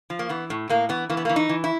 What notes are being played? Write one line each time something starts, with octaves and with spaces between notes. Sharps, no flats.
F3
A#3
E3 B3
A2
A2 A#3
E3 B3
E3 A#3
B3
A#3
E3
D#4
E3
E4